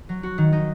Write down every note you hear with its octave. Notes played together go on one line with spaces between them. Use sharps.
F#3
F#4
D#3
D#4